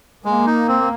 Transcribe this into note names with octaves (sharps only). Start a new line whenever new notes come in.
G#3 A#3
D#4
C4